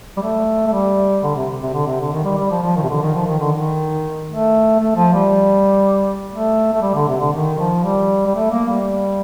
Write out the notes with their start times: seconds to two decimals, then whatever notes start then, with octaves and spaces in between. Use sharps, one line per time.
0.17 G3
0.22 A3
0.67 A3
0.72 G3
1.23 D3
1.36 C3
1.62 C3
1.74 D3
1.86 C3
2.00 D3
2.13 D#3
2.25 G3
2.38 G3
2.51 F3
2.63 F3
2.76 D#3
2.83 C3
2.89 D3
3.02 D#3
3.15 F3
3.26 D#3
3.40 D3
3.52 D#3
4.29 A3
4.79 A3
4.96 F3
5.13 G3
6.32 A3
6.73 A3
6.82 G3
6.95 D3
7.08 C3
7.20 D3
7.33 D#3
7.59 F3
7.84 G3
8.26 G3
8.35 A3
8.51 A#3
8.69 G3